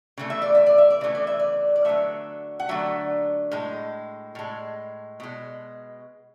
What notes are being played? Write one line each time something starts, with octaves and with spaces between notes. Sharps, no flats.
C#3 E3 A3
E5
D5
E5
D5
E5
D5
C#3 E3 A3
D5
E5
D5
D5
D3 F#3 A3 E5
F#5
D3 F#3 A3 E5
A2 G#3
A2 G#3
B2 G#3